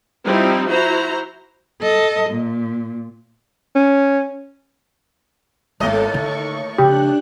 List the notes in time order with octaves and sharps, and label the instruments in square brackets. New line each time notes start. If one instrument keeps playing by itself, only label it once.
[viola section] F3 G3 C4 D#4 E4
E4 F#4 C5 A#5
[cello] A4 D#5
A#2
[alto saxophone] C#4
[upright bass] G#1 B3 [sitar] D#2 A2 D#5 [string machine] A4
[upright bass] D3 D#4 [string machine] C#6
[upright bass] C#3 F3 [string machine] D4 F#6 [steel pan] G4